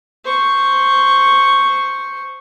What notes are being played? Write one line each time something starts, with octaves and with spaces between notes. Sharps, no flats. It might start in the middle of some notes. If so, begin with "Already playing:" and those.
C5 C#6